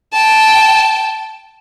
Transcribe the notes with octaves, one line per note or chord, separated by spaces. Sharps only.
G5 A5